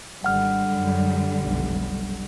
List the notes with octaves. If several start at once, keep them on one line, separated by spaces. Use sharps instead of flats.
G#1 D3 G3 F#5 F6
F#2
F1 B1